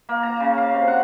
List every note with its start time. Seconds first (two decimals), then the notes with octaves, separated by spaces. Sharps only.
0.09 A#3
0.23 A#5
0.40 C#3
0.58 F5
0.74 C3
0.88 F#5